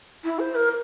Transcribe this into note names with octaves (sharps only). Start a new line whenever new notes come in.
E4
C5
A#4